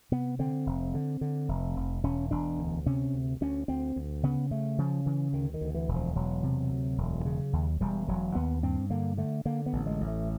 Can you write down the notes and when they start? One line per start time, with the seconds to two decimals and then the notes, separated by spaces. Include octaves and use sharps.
0.12 C3 B3
0.39 D3 C4
0.66 F1
0.94 D3
1.21 D3
1.48 F1
1.76 F1
2.04 E1 C#4
2.31 E1 D4
2.59 D2
2.86 C3 C#4
3.14 D2
3.41 D2 C#4
3.68 D2 C4
3.96 D2
4.23 C#3 B3
4.51 C#3 A3
4.78 C#3 F3
5.06 C#3 E3
5.33 D2 D#3
5.54 D#3
5.61 D2
5.75 E3
5.89 E1
5.96 F3
6.16 E1 F#3
6.43 C3
6.70 D2
6.98 E1
7.26 C#3
7.53 D#2
7.81 E1 G3
8.08 E1 F#3
8.35 D#2 B3
8.63 G2 C4
8.90 D3 A#3
9.17 D3 A3
9.45 D3 A#3
9.66 B3
9.73 A1
9.86 G#3
10.01 A1
10.07 A3